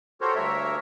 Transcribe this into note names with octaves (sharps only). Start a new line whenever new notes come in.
F#4 G4 A4 A#4 C5 C#5
D2 G2 A#3 A#4 C#5 E5